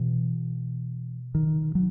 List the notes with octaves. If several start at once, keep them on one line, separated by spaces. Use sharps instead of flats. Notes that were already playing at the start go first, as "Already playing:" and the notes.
Already playing: B2 E3
D#3
F#3